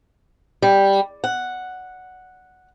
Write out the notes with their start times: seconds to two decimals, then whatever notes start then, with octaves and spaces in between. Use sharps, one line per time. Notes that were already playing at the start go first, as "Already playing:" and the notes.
0.62 G3
1.24 F#5